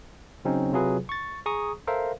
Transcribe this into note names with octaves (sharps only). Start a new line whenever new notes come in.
C#3 F#3 C4 C#4 D#4
C3 F#3 F4 G#4 B4
C#6 A6
G#4 A#5 C#6 D#6
A4 A#4 C5 E5 F5